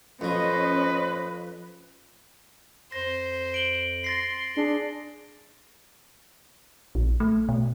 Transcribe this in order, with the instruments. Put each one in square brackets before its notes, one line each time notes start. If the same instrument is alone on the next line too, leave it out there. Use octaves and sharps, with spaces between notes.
[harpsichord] F2 F3 [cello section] C#4 C5 D#5 [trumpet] B4
[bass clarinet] F2 [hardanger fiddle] C5 [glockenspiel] A#6
[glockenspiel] D7 F#7 G7
[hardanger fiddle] C6 [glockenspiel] A6 A#6 C7
[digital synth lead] D4 [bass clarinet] G#4
[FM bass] A#1
A3
B2